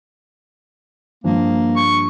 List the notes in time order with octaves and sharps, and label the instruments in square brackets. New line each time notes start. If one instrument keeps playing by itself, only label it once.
[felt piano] G2 F3 [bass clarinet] A#3
[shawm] C#6